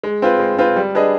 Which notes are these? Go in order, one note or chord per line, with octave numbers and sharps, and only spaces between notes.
G#3
C4 F4 B4
G#3
C4 F4 B4
G3
D4 G#4 B4 D#5